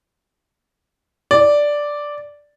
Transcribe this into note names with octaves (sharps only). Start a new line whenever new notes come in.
D5